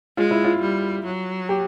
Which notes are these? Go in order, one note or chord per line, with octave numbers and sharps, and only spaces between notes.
G#3 F4
E4
F4
G3
F#3
G4